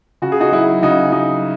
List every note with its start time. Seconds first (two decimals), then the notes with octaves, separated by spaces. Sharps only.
0.22 C#3 F#4
0.32 G#4
0.40 D#4 F#4
0.52 F#3 E4 G#4
0.82 C#3 D#4 F#4
1.12 F#3 D#4